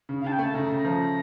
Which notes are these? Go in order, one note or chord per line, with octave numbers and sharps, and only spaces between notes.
C#3
F5
C#3 A5
G5
A3 A5
C#3 A#5
C#3
F3